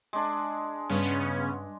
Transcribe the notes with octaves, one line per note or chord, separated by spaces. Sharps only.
G#3 D4
G2 C#3 B3 C#4